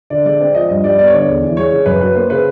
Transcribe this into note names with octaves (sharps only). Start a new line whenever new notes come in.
D3 D5
G#3 D5
C4 D5
F3 D#5
G2 D#5
G3 D5
B3 D5
C#5
D3 D5
E2
E3
G#3 C#5
C#3
F#2 B4
F#3 B4
A#3 C5
C#3 B4